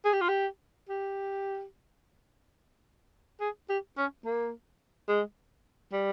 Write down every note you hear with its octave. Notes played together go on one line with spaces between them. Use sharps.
G#4
G4
F4
G4
G4
G#4
G4
C#4
A#3
G#3
G3